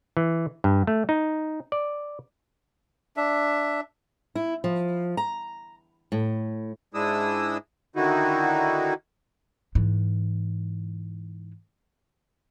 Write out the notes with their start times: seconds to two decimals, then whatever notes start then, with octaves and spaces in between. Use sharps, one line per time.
0.17 E3
0.64 G2
0.87 A3
1.09 D#4
1.72 D5
3.17 D4 E5
4.35 E4
4.64 F3
5.17 A#5
6.12 A2
6.94 G#2 G#3 D4 E4 D#6 E6
7.96 D3 D#3 D#4 E4 F#4
9.75 G#2 E3